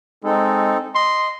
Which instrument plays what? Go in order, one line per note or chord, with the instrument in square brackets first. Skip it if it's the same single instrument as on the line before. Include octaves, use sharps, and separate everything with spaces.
[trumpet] G#3 [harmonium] C4 D#4 A4
[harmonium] D#5 [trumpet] C6